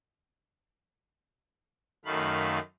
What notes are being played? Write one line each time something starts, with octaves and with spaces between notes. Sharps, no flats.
F#2 D#3 A3 F5 B5